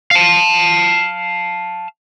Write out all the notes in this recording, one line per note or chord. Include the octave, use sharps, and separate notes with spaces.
F5 A5